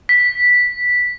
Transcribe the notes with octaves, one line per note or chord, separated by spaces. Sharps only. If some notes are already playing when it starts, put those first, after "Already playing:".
B6